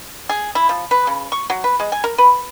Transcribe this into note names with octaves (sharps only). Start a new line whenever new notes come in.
G#4
E4
F3
B4
C#3
C#6
F#3
B4
G#3
G#5
A#4
B4